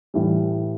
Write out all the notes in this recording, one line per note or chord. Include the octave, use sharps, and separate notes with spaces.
A2 E3 G3